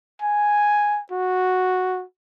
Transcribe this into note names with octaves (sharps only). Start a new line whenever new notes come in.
G#5
F#4